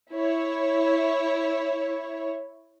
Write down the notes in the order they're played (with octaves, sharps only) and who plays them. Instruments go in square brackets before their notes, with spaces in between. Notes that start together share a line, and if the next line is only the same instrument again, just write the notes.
[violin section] E4 C#5